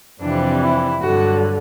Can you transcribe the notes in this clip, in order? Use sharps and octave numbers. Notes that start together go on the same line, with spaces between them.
F2 C3 E3 G3 D4
E4
G2 D3 F#3 F#4